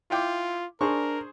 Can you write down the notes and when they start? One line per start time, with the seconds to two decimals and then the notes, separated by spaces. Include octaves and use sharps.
0.11 E4 F4 G5 D6
0.81 D4 G#4 A#4 C5 C#6